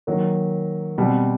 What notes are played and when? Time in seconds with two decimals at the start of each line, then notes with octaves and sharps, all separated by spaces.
0.07 D#3 F#3 A#3
0.98 B2 G3 C4